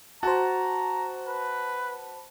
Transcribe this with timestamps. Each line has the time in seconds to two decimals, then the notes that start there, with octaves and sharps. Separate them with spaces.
0.23 F#4 C5 A5 A#5
1.27 B4